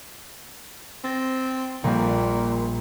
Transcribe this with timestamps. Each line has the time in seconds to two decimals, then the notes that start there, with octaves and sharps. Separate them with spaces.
1.04 C4 A6 A#6
1.84 A#1 A#2 G3